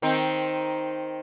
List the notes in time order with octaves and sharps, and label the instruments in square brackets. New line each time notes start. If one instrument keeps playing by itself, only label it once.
[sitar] D#3 C4 D#4